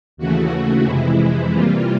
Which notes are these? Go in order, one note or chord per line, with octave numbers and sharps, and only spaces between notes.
D#2 C#3 E3 A3 F#4
F2 C3 E3 G#3 E4
C3 E3 G3 A#3 F4